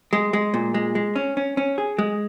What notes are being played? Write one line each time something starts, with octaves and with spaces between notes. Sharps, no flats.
G#3
G#3
A#2
G#3
G#3
C#4
C#4
C#4
G#4
G#3